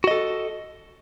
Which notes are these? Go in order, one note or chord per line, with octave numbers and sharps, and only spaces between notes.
F#4 A4 D#5